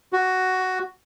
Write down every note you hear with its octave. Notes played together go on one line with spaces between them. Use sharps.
F#4